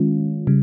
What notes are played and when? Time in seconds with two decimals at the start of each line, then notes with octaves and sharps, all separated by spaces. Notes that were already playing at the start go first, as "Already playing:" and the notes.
Already playing: D#3 G#3 C#4 F4
0.47 C#3 G3